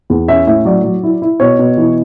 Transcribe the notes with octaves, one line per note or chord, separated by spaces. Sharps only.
E2
C#4 E5
A2 E5
F#3 D5
F#3
E4
E4
B2 C#5
B2
E3